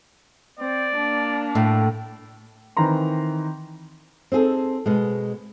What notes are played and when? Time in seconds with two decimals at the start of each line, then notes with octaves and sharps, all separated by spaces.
0.59 C4 D5
0.96 A#3 D4
1.55 A2
2.77 D#3 E3 C4 A#5 C6
4.32 C4 D#4 G#4 A4
4.86 B2 G#3